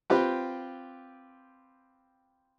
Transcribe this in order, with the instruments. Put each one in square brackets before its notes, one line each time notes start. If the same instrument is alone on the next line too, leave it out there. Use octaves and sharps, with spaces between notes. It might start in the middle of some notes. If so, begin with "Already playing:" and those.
[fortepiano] C4 F4 G4 B4